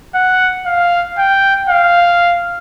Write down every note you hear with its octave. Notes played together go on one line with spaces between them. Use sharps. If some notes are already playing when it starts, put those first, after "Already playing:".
F#5
F5
G5
F5